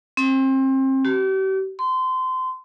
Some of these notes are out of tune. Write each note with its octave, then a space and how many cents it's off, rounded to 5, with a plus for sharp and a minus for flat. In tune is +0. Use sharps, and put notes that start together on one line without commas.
C4 +30
G4 -40
C6 -25